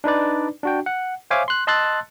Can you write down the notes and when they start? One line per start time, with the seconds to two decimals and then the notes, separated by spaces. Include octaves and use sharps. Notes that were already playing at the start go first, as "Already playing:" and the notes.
0.04 D4 D#4 B4 D5
0.63 D4 F#4 G5
0.86 F#5
1.31 C5 C#5 E5 F5 G#5 D6
1.48 C6 F#6
1.67 D#5 A5 C6 E6 F#6 A6